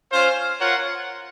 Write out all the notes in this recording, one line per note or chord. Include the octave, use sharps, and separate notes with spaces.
C#4 F4 C5 F5
F4 A#4 C#5 F#5